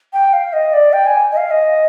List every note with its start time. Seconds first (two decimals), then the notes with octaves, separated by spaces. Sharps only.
0.13 G5
0.33 F5
0.53 D#5
0.73 D5
0.93 G5
1.06 G#5
1.32 D#5
1.37 F5
1.51 D#5